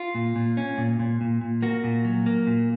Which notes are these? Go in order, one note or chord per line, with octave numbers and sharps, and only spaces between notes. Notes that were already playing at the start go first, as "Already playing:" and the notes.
Already playing: F4
A#2
A#2
C#4
A#2
A#2
A#2
A#2
A#3 F#4
A#2
F#3
A#3
A#2